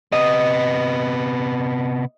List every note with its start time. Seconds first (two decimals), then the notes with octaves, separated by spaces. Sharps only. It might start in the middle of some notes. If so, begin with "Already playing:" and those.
0.12 C3 B3 D#5